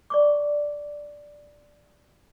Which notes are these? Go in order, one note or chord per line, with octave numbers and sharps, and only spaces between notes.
D5 C#6 D6